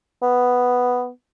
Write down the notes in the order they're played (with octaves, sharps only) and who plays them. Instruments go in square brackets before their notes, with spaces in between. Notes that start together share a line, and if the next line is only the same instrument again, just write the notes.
[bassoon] B3